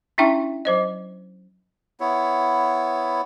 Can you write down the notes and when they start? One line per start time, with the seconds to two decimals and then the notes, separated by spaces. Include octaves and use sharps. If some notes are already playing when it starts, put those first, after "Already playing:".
0.18 C#4 D4 E4 E5 G5 C#6
0.65 F#3 C5 D#5
2.00 B3 E4 C#5